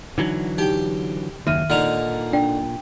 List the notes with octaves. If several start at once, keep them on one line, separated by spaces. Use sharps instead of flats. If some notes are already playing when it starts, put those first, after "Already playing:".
D3 E3 F#3 D#4
D#4 G4 G5
F#1 D#2 D#3 E5 F6 D#7
A#2 D3 D#4 F6 F7
D4 G5